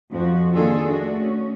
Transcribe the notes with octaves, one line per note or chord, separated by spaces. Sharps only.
F2 F3 F#4
D#3 A#3 D4 F4 G#4 A4
A3 D4 F#4
C#4